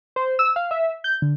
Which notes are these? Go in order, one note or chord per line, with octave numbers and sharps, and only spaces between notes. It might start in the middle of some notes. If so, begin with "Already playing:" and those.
C5
E6
F5
E5
G6
D3